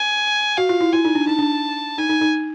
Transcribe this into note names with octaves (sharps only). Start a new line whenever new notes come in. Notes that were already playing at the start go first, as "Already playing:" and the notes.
Already playing: G#5
F#4 F5
F4
E4
E4 G#5
D#4
D4
D#4 A5
D4
D#4 G#5
D#4
D#4